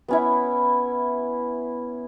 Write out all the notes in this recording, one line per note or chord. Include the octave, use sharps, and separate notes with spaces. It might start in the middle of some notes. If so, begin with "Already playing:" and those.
B3 C#4 E4